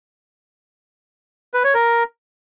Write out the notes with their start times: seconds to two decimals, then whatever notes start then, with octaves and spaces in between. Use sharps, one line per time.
1.54 B4
1.64 C#5
1.74 A#4